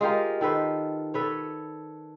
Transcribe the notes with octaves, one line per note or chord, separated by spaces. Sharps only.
G#3 F4 G4 A#4
D#3 A4 B4 C5
A4 B4 C#5